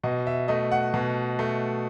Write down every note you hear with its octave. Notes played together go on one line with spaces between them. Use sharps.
B2 D#5
E5
A3 D#5
F#5
B2
A3